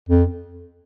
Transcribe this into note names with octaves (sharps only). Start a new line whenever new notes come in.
F2